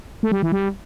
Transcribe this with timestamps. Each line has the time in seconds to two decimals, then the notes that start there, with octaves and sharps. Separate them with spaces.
0.23 A3
0.32 G3
0.43 E3
0.52 G3